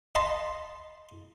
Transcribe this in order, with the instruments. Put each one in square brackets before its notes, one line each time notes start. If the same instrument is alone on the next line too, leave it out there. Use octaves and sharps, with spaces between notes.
[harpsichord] D#5 F5 A5 B5 C6